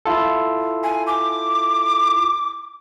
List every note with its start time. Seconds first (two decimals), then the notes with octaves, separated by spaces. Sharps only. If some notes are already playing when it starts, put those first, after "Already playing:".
0.06 E4 F4 A4
0.83 G#5
1.07 D6